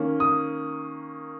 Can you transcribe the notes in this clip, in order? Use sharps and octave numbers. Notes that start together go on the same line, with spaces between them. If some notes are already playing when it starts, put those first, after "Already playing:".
Already playing: D#3 A#3 C#4
D#6